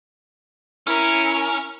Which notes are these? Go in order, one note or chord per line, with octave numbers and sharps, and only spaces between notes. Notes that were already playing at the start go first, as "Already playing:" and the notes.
C#4 E4 A#4